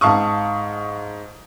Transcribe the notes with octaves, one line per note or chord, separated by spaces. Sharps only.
G#2 F5 A5 C#6 D#6